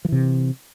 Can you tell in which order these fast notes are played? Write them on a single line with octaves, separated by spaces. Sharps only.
F3 E3 C3